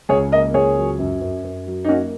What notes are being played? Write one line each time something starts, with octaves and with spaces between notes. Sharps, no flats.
C#2 G#4 C#5
A#3 A#4 D#5
C#2 G#4 C#5
F#3
F#2
F#2
F#2
F#3
D#4
A#3 C#4 F#4